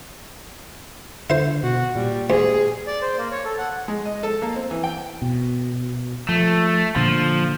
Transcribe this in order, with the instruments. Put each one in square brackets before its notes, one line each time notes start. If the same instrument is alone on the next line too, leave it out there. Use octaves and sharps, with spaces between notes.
[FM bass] D3 [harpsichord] E4 C5
[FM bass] B2 [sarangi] F#4
[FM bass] A#2 [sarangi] G3
[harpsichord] D2 [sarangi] G#4
[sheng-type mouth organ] D5
C5
A#3
C#5
A4
F#5
[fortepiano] G#3
D#5
A4
A#3
C4
E3
G5
[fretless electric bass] B2
[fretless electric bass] F3 [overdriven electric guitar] A3
[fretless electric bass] A#2 D3 [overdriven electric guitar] F3